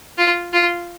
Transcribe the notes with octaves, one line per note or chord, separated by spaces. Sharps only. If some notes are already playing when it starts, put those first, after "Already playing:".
F4
F4